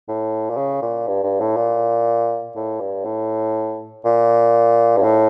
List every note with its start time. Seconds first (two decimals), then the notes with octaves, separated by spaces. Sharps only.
0.08 A2
0.50 A#2
0.57 C#3
0.82 A#2
1.08 G2
1.23 G2
1.41 A2
1.57 A#2
2.56 A2
2.81 G2
3.05 A2
4.05 A#2
4.97 G2
5.03 A2